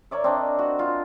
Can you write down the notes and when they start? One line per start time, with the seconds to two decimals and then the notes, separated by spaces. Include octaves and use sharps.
0.11 A#4 C#5 D5 E5
0.24 C4 D4 D#5
0.59 F#4
0.79 F4